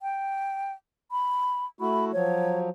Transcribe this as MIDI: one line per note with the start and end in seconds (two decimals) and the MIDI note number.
0.02 0.73 79
1.12 1.66 83
1.81 2.11 57
1.81 2.11 64
1.81 2.11 66
1.81 2.05 83
2.13 2.69 53
2.13 2.69 54
2.13 2.59 73